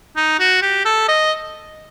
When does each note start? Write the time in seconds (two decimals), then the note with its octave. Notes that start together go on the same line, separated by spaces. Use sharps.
0.16 D#4
0.40 F#4
0.62 G4
0.85 A4
1.08 D#5